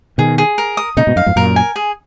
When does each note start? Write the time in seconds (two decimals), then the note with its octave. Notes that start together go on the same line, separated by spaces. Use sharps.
0.18 B2 D#3 G#4
0.38 G#4
0.58 A#4
0.77 D#6
0.97 A#2 C#3 D#4
1.07 G#2 B2
1.16 F#2 F5
1.26 F2 G#2
1.36 F#2 A#2 A#4
1.56 G#5
1.76 G#4